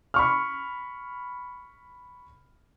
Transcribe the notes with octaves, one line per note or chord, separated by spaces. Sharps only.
B5 C#6 F6